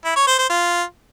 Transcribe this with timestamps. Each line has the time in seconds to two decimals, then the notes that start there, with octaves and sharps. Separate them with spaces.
0.05 E4
0.16 C#5
0.27 C5
0.39 C5
0.50 F4